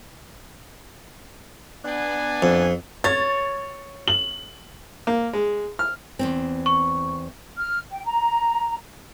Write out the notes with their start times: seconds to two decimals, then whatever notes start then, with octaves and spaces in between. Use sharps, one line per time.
1.85 B3 D4 G#5
2.42 F2
3.04 C#5 A6
4.08 F#7
5.07 A#3
5.33 G#3
5.79 F6
6.19 E2 G2 C4
6.66 C#6
7.56 F6
7.92 G5
8.05 A#5